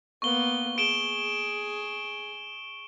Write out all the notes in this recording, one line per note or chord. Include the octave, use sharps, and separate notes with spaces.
A#3 B3 C#6 G7
G#4 D7 E7 G7